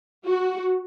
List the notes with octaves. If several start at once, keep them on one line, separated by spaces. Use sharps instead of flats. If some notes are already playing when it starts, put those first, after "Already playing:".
F#4